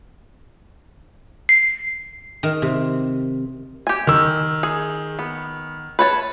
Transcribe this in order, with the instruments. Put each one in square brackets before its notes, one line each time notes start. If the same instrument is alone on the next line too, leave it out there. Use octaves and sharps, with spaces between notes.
[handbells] C7
[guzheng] D#3
C3
[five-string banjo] G4 G#5
[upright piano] D#3 E6
[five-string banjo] G#4
B3
B4 C#5 A5